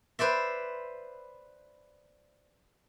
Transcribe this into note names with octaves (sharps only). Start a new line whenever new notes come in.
B4 C5 D5 E5